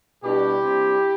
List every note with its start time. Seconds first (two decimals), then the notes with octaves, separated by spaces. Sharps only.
0.24 B2 G3 D4 E4 G4
0.64 C3 G3 D4